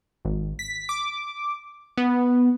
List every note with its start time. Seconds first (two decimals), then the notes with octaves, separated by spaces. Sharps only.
0.25 G#1
0.59 B6
0.89 D6
1.97 B3